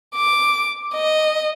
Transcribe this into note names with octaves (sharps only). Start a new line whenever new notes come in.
D6
D#5